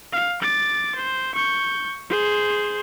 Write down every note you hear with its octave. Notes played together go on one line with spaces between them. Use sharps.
F5
D6 A6
C5
C#6 G6
G#4 C5